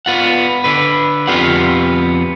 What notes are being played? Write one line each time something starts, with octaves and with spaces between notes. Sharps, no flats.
B3 F4 F#5
D3 B4
F2 B3 C4 F4 G4 F#5